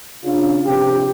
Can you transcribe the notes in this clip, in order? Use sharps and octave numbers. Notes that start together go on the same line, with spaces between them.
C#3 D4 F4
A#1 C3 G4